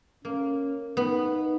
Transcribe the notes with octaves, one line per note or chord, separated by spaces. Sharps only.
A#3 C#4
B3 D#4